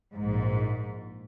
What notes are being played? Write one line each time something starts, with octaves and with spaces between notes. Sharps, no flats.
A#1 G#2